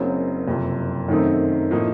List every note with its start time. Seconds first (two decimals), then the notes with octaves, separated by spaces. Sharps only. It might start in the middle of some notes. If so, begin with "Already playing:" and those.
Already playing: F#1 F#2 C#3 F#3 C4
0.47 F#1 F2 C3
1.09 F#2 D#3 A3 C4 D#4
1.71 A2 F3 A#3 D#4